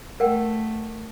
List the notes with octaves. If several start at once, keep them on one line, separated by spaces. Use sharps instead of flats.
A3 A#4 F#5 G5